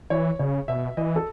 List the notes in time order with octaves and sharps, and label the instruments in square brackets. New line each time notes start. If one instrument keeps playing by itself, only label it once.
[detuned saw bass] E3 [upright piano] C#5
[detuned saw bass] C#3 [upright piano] C#5
[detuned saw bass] B2 [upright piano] E5
[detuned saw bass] E3 [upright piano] D#5
[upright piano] A4